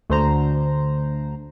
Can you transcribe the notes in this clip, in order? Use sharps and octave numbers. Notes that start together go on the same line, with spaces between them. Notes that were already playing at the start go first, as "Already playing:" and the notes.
D2 D3 C5 A#5